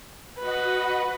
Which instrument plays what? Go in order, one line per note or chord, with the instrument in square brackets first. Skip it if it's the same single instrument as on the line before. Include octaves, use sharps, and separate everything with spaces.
[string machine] F#4 D#5 F#5 [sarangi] B4